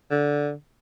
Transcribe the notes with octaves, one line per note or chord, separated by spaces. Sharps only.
D3